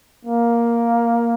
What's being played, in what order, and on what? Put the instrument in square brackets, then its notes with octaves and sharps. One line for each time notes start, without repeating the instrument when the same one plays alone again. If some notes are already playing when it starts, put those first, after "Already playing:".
[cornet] A#3